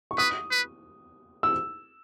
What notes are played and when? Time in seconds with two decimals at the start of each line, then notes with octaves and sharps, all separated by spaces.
0.11 C#6
0.18 B4 D#6
0.51 B4
1.43 E6